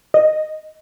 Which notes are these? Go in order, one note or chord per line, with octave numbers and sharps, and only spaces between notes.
D#5